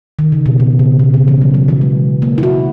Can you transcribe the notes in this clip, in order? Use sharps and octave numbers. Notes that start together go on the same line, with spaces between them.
D#3
C#3
B2
B2
C#3
B2
C#3
E3
F#3
F#3
E3
G#3
A#3
E4
F#4